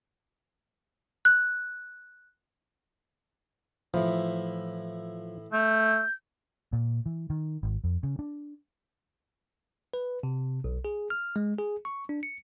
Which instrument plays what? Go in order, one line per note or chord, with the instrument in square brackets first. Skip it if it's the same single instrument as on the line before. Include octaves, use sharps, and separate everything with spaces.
[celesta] F#6
[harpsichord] A2 E3 [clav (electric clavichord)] F3
[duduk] A3 [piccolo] G6
[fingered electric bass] A#2
E3
D#3
G#1
F2
C#3
D4
[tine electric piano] B4
C3
B1
G#4
F6
G#3
G#4
C#6
D4
C#7